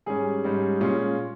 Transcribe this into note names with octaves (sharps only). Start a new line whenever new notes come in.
G#2 G3 C#4 G#4 G#5
G#2 G3 C#4
A#2 G#3 C#4 F4